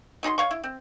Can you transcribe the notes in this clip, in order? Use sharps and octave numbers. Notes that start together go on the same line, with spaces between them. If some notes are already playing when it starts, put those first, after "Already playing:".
F#3 D#4 G#4 C6
C#5 F5 C#6
E4
C4